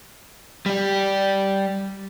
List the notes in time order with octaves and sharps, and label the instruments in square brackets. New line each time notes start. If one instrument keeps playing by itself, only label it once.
[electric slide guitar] G3 G4